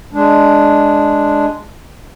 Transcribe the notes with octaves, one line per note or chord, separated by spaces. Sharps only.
G#3 D4